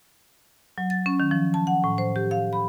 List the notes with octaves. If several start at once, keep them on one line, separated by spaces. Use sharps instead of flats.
F#3
A6
C#4
D#3
F3
A5
F#5
A2
C5
G4
F5
B5